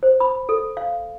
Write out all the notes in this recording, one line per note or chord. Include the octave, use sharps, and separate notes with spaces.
C5
B5
A4
F5